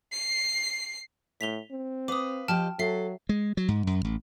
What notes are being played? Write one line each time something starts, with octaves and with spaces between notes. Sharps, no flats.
C7
A2 B6 F7 G7
C4
B4 F5 D6 D#6
F3 G4 D#5 G5 A5 F6
F#3 A4 E5 C7
G#3
F#3
G#2
F#2
A1